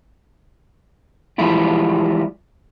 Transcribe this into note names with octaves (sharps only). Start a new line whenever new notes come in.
E3 F3 G3 G#3 E4 F4